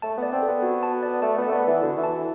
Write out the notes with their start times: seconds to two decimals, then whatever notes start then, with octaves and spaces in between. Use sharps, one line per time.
0.02 A3 A5
0.17 B3
0.23 D5
0.32 C4
0.43 A4
0.48 B3
0.62 F#4
0.83 A5
1.03 D5
1.22 A3 A5
1.38 B3 D5
1.49 A3
1.52 B3
1.63 E3 A4
1.82 D3 F#4
1.98 E3
2.03 A5
2.12 E3